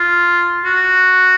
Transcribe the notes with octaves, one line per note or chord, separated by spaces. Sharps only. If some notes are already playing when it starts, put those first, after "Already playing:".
Already playing: F4
F#4